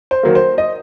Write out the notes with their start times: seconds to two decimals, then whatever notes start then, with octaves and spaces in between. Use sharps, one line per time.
0.11 C5
0.23 D#3 F#3 A#3
0.35 C5
0.58 D#5